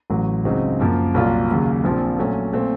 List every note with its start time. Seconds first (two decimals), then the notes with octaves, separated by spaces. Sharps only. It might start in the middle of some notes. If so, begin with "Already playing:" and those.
0.10 A1 A2 F#3
0.45 C#2 C#3 F#3 C4 D#4
0.80 F#2 F3 A#3
1.14 C2 A#2 F#3 A#3 F4
1.49 D#2 C#3 F#3 A#3
1.84 A#1 A#2 F3 C4 F4
2.18 A#2 F#3 A3 C#4
2.53 A#2 A3 C4